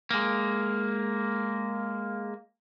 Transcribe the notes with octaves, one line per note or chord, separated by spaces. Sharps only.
G#3 A#3